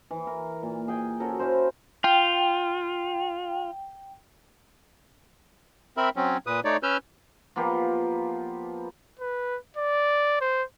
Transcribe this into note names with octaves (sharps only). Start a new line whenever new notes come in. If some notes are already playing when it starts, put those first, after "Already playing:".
E3
A#4
A#2
G#4 G5 G#5
C#4 F#4 A4 A#4
C#4 E4 A#4 C5
F4 G5
C4 A#4 E5 B5
F#3 C4 C#4
A#2 B4 D#6
A3 D#4 C#5 D5
C#4 B4 E6 F6 G6
F3 A#3 B3 G4
B4
D5
C5